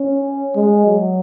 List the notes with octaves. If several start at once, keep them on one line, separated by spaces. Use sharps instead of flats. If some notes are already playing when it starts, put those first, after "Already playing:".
Already playing: C#4
G#3
F#3